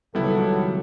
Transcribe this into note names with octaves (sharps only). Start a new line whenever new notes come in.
C#2 D#3 F#3 G3 B3 E4 A4